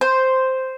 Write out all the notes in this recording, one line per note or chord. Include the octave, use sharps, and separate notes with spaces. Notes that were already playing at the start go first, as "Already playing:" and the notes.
C5